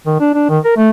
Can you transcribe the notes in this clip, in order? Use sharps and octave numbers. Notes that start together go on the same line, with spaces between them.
D#3
D4
D4
D#3
A#4
A3